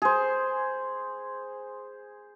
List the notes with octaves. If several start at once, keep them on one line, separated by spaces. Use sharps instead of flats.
G#4 C5